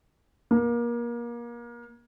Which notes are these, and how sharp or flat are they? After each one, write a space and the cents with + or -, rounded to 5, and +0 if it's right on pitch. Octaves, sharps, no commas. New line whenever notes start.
A#3 +30